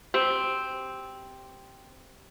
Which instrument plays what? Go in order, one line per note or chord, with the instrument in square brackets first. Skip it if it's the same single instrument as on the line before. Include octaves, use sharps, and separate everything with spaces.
[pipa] C4 [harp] G4